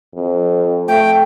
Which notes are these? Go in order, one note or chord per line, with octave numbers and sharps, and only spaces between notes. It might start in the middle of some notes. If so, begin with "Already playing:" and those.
F2
A3 G5